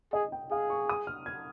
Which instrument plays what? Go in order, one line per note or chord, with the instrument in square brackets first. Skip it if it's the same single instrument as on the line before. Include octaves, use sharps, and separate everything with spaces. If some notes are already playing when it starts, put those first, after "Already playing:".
[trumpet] G#4 [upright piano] D#5
[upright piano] G5
[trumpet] G#4 [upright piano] F5
[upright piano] C#6
D#6
F6
G#6